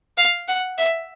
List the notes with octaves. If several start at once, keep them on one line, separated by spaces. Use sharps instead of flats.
F5
F#5
E5